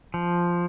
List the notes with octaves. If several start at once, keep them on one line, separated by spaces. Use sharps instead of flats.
F3